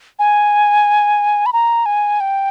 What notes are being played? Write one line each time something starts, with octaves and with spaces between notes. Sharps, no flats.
G#5
B5
A#5
G#5
G5